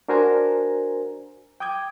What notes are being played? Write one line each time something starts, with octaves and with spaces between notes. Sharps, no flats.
D4 F#4 A#4 C5 G#5 A#5
G5 D6 D#6 G6 G#6